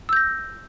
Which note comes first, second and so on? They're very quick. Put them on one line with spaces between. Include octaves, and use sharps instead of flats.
E6 G6 A#6